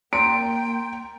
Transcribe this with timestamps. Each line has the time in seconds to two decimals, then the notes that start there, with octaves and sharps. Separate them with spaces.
0.13 A#3 G5 A#5 C6 D7